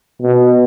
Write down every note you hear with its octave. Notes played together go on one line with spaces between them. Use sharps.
B2